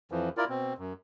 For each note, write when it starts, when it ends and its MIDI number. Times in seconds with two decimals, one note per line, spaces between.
0.12 0.29 41
0.12 0.29 52
0.12 0.29 53
0.37 0.45 64
0.37 0.45 65
0.37 0.45 70
0.37 0.45 74
0.49 0.73 47
0.49 0.73 60
0.78 0.93 42